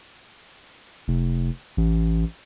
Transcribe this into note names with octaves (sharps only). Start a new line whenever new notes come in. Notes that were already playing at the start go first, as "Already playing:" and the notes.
F1
A1